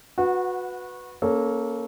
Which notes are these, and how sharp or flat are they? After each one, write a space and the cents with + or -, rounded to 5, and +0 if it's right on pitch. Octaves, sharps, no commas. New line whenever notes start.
F#4 -25 B4 +0 F#5 +0
A#3 +0 C#4 +0 A4 -25